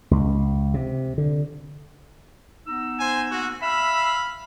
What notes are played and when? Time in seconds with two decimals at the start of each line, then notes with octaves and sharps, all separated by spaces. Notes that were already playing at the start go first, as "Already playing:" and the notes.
0.11 C#2
0.74 C3
1.18 D3
2.67 B3 D#4 E6
3.00 C5 G#5
3.32 A#3 F#4
3.63 E5 F5 B5 E6